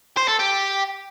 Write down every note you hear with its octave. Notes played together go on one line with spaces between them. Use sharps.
C5
A4
G4